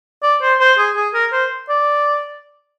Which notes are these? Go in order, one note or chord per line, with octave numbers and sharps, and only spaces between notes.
D5
C5
C5
G#4
G#4
A#4
C5
D5